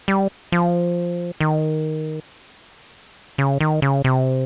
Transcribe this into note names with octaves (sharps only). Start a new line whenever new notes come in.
G3
F3
D#3
C#3
D#3
C#3
C3